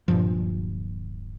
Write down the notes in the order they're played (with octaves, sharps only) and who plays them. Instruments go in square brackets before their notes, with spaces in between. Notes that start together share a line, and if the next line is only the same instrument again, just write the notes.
[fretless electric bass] D1 G2 A#2 F3